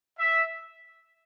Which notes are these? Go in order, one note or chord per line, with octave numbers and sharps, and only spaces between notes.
E5